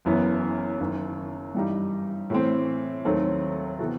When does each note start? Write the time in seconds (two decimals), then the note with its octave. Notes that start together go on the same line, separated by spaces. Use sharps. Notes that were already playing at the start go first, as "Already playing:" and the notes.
0.05 F#1 F#2 E3 B3
0.80 F#1 F#2 D#3
1.54 G2 E3 G3 D#4 G4
2.30 A2 E3 A3 C4
3.05 D#2 D#3 F#3 A3 C4
3.79 C3 E3 B3 F#4 A4